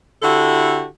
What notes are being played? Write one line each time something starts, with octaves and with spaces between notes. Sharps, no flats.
D3 E4 F#4 G4 A4